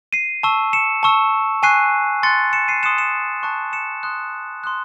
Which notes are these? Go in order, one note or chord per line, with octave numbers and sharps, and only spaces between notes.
C7 D#7
A5 C#6 E6
C#7 E7
A5 C#6 E6
G#5 C#6 F#6 C7 D#7
C6 F#6 A6 C#7
C#7 E7
C7 D#7
C6 D#6 F#6 C#7 E7
C#7 E7
A5 C#6 F#6
C#7 E7
C6 D#6 F#6
C6 D#6 F#6